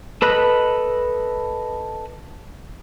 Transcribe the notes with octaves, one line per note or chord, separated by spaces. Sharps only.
A4 B4 D#5 B5 F#6